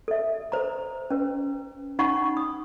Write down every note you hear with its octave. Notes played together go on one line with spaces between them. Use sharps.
A4 E5
A4 B4 C5 A#5
C#4 B4
C#4 D#4 F#5 A5 B5 C#6
D#6